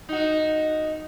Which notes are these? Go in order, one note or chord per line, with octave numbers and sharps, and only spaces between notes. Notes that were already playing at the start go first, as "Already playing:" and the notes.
D#4 F#4